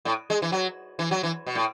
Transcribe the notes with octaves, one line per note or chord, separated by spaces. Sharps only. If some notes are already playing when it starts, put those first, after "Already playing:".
A2
G#3
E3
F#3
E3
F#3
E3
B2
A2